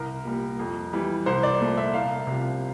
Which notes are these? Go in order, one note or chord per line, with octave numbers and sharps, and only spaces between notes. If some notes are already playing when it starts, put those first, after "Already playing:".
Already playing: C2 A#4
A#2 G3 A#3
F2
E3 G3
C2 C5
D5
A#2 A3
E5
C2 F5
C3 F3